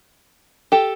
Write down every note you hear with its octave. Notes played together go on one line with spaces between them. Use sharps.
G4 A4